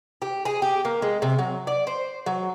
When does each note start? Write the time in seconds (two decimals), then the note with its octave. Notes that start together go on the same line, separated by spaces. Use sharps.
0.22 G4
0.45 G#4
0.62 G4
0.85 A#3
1.02 G#3
1.22 C3
1.39 F#3
1.67 D5
1.87 C5
2.26 F#3